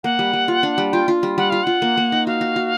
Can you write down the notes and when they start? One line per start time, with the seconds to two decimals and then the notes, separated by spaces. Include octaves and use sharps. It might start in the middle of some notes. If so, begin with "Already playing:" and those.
0.04 A#3 F#5
0.19 G3
0.33 G3
0.48 F4
0.63 D4
0.78 G3
0.93 F4 G5
1.08 F4
1.23 G3
1.38 G3 F#5
1.50 F4 F5
1.64 F4 F#5
1.82 A#3
1.97 A#3
2.12 D#4
2.27 F#4 F5
2.41 F#4
2.56 F#4